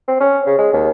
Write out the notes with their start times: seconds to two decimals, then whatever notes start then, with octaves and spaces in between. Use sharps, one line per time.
0.08 C4
0.20 C#4
0.46 C#3
0.59 G#3
0.73 D#2